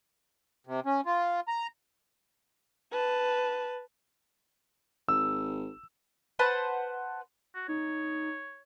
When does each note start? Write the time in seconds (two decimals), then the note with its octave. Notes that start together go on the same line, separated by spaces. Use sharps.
0.67 C3
0.86 C#4
1.06 F4
1.48 A#5
2.92 B4 A5
5.09 G#1 E6
6.39 B4 C5 F#5 A5
7.55 F#4
7.68 D#4 C#5